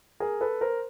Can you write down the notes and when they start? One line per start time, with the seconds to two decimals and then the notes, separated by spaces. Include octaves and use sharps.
0.20 G#4 A#4
0.41 A4 B4
0.61 A#4 C5